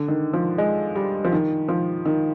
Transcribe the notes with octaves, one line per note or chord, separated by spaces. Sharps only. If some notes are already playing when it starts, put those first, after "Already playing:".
Already playing: D3
D#3
F3
G#3
G3
F3
D#3
F3
D#3